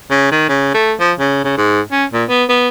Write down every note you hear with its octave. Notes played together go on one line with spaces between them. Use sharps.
C#3
D#3
C#3
A3
F3
C#3
C#3
G#2
C#4
A#2
B3
B3